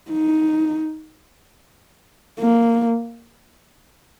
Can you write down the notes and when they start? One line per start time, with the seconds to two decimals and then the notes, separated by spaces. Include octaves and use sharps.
0.11 D#4
2.39 A#3